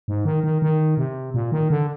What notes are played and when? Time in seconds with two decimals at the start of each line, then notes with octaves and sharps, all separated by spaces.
0.08 G#2
0.25 D#3
0.44 D#3
0.62 D#3
0.97 C3
1.34 A#2
1.52 D#3
1.70 D3